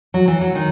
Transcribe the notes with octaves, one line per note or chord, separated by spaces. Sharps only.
F#3
E3
F#3
D#3